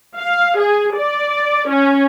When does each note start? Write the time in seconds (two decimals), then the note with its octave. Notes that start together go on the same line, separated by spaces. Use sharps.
0.17 F5
0.60 G#4
0.97 D5
1.70 C#4